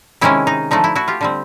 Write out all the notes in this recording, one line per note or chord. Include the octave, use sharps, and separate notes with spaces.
C3 D#3 G#3 C#4 E4
D#4
D3 F3 A3 D#4
E4
E4 F#4
F4 G4
D3 G3 C4